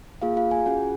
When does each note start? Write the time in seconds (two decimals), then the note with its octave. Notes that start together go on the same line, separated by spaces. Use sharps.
0.22 A#3 F4 G#4 F5
0.37 F4 F5
0.51 G#4 G#5
0.66 C#4 F4 F#4 G#4 F#5